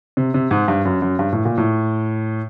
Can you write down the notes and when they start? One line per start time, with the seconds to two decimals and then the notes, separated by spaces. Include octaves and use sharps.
0.17 C3
0.34 C3
0.51 G#2
0.68 G2
0.85 F#2
1.02 F#2
1.19 G2
1.32 A2
1.45 A#2
1.58 A2